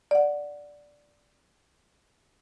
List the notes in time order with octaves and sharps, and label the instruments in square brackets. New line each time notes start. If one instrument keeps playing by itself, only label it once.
[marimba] D5 F#5